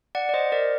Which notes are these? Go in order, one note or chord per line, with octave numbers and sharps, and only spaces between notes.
D5 F#5
D5
C5 D#5
A#4 D5